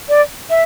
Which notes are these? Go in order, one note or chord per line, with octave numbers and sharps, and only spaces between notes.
D5
E5